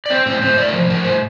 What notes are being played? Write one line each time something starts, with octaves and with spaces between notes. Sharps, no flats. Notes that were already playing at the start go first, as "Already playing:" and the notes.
D5
C4 C5
A2 C5
A2 C5
A2 D5
A#4
F3 C5
A2 A#4
A2 C5